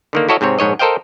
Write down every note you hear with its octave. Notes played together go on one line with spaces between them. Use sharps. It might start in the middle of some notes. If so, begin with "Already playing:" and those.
D3 D#3 A#3
E4 F#4 A4 C#5 D#5 F5
G#2 C3 C4 C#5
A#1 G#2 C#5 D#5
A4 A#4 C5 D#5 F5 G5